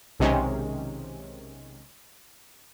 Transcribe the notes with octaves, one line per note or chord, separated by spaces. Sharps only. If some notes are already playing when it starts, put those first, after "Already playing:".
B1 C3 D#3 G#3 C#4